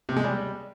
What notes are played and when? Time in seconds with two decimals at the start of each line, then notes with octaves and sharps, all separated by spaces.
0.09 C3
0.17 G#3
0.24 G3